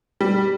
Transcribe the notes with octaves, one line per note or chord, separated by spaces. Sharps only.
G3